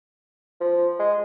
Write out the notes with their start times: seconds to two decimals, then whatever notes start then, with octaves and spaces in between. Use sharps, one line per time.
0.61 F3
1.00 G#3